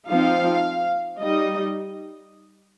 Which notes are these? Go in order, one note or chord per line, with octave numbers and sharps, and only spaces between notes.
F3 C4 D#4 F5
G3 D#4 D#5